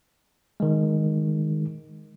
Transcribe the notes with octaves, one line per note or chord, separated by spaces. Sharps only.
D#3 G#3